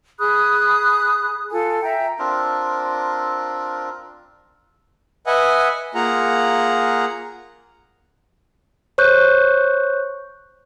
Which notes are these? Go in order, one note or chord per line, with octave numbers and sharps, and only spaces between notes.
G#4 B5 D#6 F#6
F4 A4 G#5
E5 G5 A#5
C4 D4 F4 A#4
B4 D#5 E5 F#5 G#5
A#3 F4 G#4 F#5 A#5
C5 C#5 C#6 F#6 G6